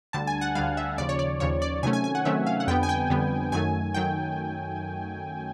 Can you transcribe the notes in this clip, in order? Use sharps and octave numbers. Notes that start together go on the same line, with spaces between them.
D2 D3 G3 A5
G#5
F#5
D2 D3 G3 F5
E5
D#2 C#3 F3 D5
C#5
D5
D#2 C#3 F3 C#5
D5
C3 D#3 F#3 A3 C#4 G#5
G#5
G#5
F#5
C3 D#3 F#3 A3 C#4 E5
F5
F#5
F2 D3 G3 B3 G5
G#5
G5
F2 D3 G3 B3
F#2 D#3 F#3 A3 G#5
D#3 F#3 G5